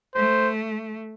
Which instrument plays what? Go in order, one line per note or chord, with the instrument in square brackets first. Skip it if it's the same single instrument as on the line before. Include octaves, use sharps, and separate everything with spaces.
[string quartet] A3 [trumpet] C5